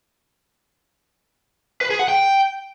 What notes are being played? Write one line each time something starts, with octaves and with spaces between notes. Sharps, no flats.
B4
G#4
F#5
G5